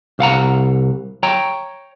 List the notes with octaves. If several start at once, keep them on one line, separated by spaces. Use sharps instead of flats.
C2 F5 F#5 A#5
C#5 G5 A#5